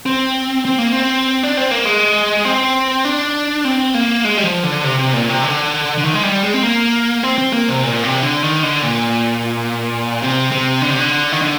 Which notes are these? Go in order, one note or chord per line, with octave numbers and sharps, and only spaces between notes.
C4
C4
A#3
C4
D4
C4
A#3
G#3
C4
D4
C4
A#3
G#3
G3
F3
D3
C3
C3
A#2
C3
D3
D3
D#3
G#3
G3
G#3
C4
A#3
C4
C4
A#3
C3
A#2
C3
D3
D#3
D3
A#2
C3
C3
D3
C3
D3
D#3
D3